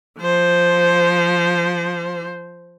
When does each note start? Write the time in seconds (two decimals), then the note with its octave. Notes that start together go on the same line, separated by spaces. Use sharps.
0.20 F3 C5